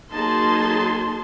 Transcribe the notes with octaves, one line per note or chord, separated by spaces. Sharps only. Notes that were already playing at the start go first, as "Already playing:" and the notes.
F#3 A#3 D#4 G#4 A5 C6